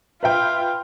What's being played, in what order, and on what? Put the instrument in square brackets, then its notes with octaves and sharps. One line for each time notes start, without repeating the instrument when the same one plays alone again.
[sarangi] F4 [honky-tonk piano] B4 E5 G5